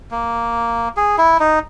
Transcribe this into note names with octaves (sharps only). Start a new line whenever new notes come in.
A#3
G#4
E4
D#4